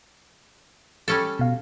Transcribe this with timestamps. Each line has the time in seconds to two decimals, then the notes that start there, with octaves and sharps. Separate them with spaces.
1.08 G3 C#4 A4
1.39 B2 F5